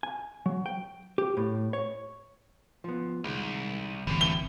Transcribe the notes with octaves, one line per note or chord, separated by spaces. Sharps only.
G#5
F#3
G5
G4
A2
C#5
F3 B3
C2 D#3 G#3
G1 A2 C3 E3 C6
G7